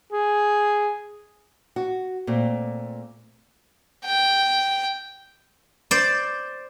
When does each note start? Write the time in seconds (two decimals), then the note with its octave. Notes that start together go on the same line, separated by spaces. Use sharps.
0.12 G#4
1.76 F#4
2.27 A#2 A3 C4
4.05 G5
5.91 C5 D5